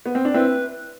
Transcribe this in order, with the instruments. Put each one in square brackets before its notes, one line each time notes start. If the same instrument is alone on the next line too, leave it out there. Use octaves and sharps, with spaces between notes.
[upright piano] B3
C4
D4
[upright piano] C4 E4 [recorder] B4